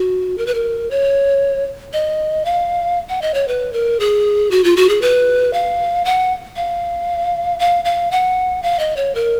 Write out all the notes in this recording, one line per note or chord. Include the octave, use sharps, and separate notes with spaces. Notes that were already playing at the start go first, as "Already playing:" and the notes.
Already playing: F#4
A#4
B4
A#4
C#5
D#5
F5
F#5
D#5
C#5
B4
A#4
G#4
F#4
F4
F#4
G#4
B4
F5
F#5
F5
F5
F5
F#5
F5
D#5
C#5
A#4